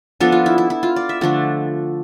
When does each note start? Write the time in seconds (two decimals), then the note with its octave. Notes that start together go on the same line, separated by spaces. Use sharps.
0.20 F3 B3 D4 A4
0.32 F4
0.46 E4
0.58 E4
0.70 E4
0.83 F4
0.96 D5
1.09 E5
1.21 D3 F3 A3 D4